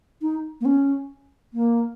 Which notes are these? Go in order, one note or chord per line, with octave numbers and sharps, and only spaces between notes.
D#4
A#3
C#4
A#3